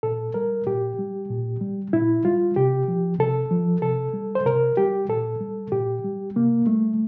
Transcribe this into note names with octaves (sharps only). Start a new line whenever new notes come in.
A#2 A4
G3 A#4
A#2 G4
G3
A#2
G3
A#2 E4
G3 F4
C3 G4
F3
C3 A4
F3
C3 A4
G3
C5
C3 A#4
G3 G4
A#2 A4
G3
A#2 G4
G3
C3 A#3
G3 A3